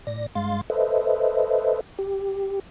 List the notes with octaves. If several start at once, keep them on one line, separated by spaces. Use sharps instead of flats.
A2 D5 A#6
G2 G#3 F5 C6 A6
A4 B4 C5 D#5 E5
G4